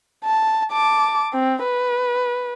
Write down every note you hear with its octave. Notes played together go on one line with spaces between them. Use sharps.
A5
A5 D6
C4
B4